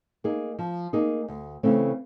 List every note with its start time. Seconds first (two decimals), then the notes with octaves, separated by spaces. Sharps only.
0.24 A#3 D#4 G#4
0.59 F3
0.93 A#3 D#4 G#4
1.28 D2
1.63 C#3 E3 A3 C4